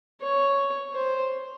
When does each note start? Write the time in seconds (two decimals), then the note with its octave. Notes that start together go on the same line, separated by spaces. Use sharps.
0.21 C#5
0.94 C5